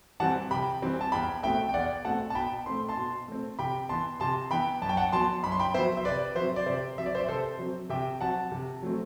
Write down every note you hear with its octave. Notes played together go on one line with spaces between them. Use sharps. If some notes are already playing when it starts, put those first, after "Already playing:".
E3 G3 C4 F#5 A5
C3 G5 B5
E3 G3 C4
A5
E2 G5 B5
B2 A3 C4 E5 G5
G5
E2 D5 F#5
B2 A3 C4 F#5 A5
A5
B2 G5 B5
A3 C4 C6
A5 C6
B2
A3 C4
C3 G5 B5
E3 B3 A5 C6
C3 A5 C6
E3 B3 G5 B5
F#2 A5
G5
F#5 A5
F#3 B3 A5 C6
F#2 B5
C6
G5 B5
F#3 B3 C5 E5
E5
C3 B4 D5
F#3 C4 C5 E5
D5
C3 C5 E5
F#3 C4 E5
D5
C5 E5
C3 A4 C5
F#3 C4
C3 E5 G5
F#3 C4 F#5 A5
C3
F#3 A3 C4